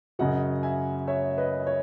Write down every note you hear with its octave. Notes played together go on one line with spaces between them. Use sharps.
F#2 C#3 F#3 D#5 F#5
E5 G#5
C#5 E5
B4 D#5
C#5